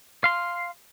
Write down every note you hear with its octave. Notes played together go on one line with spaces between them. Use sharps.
F5 C6